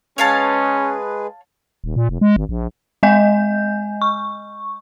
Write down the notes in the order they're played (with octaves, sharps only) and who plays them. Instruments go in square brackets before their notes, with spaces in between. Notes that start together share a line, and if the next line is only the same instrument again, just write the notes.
[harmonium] G#3 G#4 B4 [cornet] C#4 [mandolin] C#5 F5 A5
[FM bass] D#1
A#2
F1
G#3
G#1
A#1
[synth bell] G#3 D#5 G#5 G6
C#6